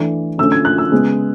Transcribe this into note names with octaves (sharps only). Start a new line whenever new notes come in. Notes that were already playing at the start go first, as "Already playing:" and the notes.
Already playing: E3 A3 D4
D3 A3 C#4 E6
G#6
F#6
E6
C#3 G#3 B3